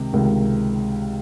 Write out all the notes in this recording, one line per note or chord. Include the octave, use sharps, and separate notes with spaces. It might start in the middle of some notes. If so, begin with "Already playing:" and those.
Already playing: C#2 C3 D#3
C#2 C3 D#3